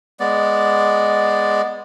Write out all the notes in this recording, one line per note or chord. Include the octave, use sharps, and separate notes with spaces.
G#3 B3 D5